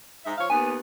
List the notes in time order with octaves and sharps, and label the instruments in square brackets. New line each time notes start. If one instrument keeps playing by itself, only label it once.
[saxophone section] G#2 D#4 E5
F3 C#5 F5
[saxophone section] D#2 B3 [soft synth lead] G#5